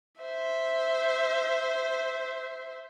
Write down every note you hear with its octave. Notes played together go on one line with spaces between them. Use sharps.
C5 E5